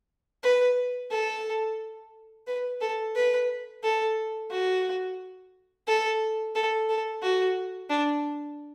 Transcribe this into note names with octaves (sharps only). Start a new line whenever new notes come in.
B4
A4
B4
A4
B4
A4
F#4
A4
A4
A4
F#4
D4